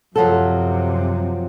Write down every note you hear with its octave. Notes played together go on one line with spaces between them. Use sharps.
F#2 C3 F3 F#3 A4